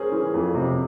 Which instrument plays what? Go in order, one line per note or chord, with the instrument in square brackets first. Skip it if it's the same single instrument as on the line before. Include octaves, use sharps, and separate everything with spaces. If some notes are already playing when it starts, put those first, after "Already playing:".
Already playing: [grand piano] C#4 G#4 A#4 C5
[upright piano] E3
F2
C3